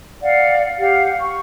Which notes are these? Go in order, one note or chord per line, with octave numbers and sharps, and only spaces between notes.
D5 F5 F#5
G4 F5 F#5
C#6